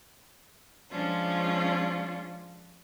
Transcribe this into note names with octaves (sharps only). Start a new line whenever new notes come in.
F3 G#3 C#4 D4 F4